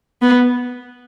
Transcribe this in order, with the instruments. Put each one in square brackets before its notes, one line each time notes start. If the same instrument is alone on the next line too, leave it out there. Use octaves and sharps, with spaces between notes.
[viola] B3